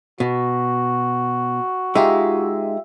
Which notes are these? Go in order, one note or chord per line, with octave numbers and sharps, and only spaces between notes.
B2 F#4
G#3 D#4 F4 G4 E5